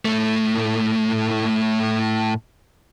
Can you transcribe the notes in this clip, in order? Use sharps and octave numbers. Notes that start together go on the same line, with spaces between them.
A2 A3